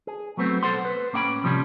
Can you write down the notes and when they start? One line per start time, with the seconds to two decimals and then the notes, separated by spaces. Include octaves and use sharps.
0.07 G#4
0.37 F#3 A3 B3 C4
0.63 B1 G#2 A4 C5 F#5 C6
0.85 B4
1.13 A2 A#3 C#4 F#5 G5 B5
1.44 C3 F3 G3 C#4